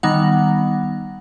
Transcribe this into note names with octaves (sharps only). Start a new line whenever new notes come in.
D#3 G3 B3 D#4 F#5